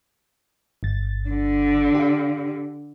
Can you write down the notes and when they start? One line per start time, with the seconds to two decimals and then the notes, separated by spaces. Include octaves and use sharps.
0.83 G1 A6
1.29 D3
1.95 G4 F5